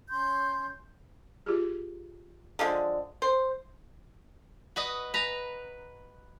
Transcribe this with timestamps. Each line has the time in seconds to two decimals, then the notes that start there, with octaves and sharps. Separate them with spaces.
0.09 C#4 C6 G6
1.46 F4 G4 G#4
2.59 D3 F3 G#3 D#5 F5
3.22 C5
4.76 F#4 B4 D#5
5.14 B4 A#5